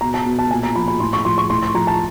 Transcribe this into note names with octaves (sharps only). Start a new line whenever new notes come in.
B2 A#5
A5
B2
A5
A#2 G#5
A#5
F3 B5
B5
A2 C6
C#6
F3 C6
C#6
A2 C6
C6
F3 A#5
A5